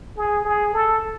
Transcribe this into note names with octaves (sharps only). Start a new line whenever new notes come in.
G#4
G#4
A4